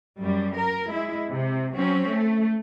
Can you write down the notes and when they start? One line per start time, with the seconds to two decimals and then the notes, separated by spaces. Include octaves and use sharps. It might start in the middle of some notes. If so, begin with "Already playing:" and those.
0.20 F#2 G3
0.56 A#4
0.89 G#3 E4
1.30 C3
1.75 F#3 C4 C#4
2.09 A3